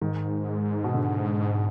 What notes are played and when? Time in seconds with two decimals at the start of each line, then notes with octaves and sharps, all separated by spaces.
0.01 G#2 D#3
0.84 B2
0.94 D3